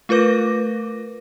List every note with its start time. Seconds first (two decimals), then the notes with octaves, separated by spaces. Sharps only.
0.09 A3 F4 A#4 B4 D6 A#6